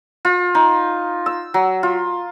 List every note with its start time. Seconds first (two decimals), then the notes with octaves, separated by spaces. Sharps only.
0.25 F4
0.55 D#4
1.26 E6
1.54 F#3
1.83 F4